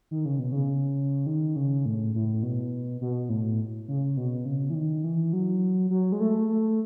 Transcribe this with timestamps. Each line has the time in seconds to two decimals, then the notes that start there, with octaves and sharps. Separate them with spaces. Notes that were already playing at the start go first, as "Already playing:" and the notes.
0.11 D#3
0.25 C#3
0.39 B2
0.52 C#3
1.26 D#3
1.56 C#3
1.86 A2
2.15 A2
2.43 B2
3.01 B2
3.29 A2
3.88 C#3
4.17 B2
4.45 C#3
4.70 E3
4.75 D#3
5.04 E3
5.33 F#3
5.90 F#3
6.12 G#3
6.20 A3
6.49 A3